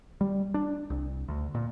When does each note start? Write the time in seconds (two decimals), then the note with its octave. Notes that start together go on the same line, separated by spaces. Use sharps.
0.21 G3
0.54 D4
0.90 C2
1.28 D2
1.55 A#2